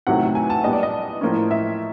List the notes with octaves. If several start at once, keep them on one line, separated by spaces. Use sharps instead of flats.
E2 C3 D#3 F#3 A3 F#5
G#5
A5
A#2 G3 B3 D4 D#5
D5
D#5
A2 F3 A#3 C#4
E5